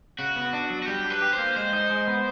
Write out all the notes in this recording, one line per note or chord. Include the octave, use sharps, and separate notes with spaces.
C#3 F#4
B3
D4
F#3
F#4
G3 G4
D4
B4
G4
C5
A#3
G#3 C5
D#4
G#3
B3